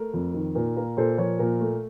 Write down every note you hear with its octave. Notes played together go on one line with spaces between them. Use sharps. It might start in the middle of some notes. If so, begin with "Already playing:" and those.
Already playing: A3 A#4
F2
D#3
A#2 A#4
A#3 A#4
A#2 A4 C5
F3 A#4 C#5
A#2 A#4
A3